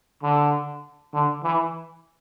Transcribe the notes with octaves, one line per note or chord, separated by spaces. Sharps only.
D3
D3
E3